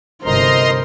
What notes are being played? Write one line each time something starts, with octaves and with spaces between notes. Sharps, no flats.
G1 C3 A#4 C5 D#5 A#5 C6